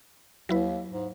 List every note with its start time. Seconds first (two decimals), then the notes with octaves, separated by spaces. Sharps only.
0.49 D#2 F#3 E4 B4
0.92 G#2